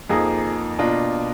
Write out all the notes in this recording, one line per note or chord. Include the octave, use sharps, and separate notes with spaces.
F2 F3 A#3 D#4 G#4
B2 A#3 D4 F4